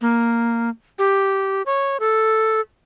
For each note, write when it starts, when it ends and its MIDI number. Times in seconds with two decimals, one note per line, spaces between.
0.01 0.69 58
0.99 1.62 67
1.66 1.97 73
2.00 2.61 69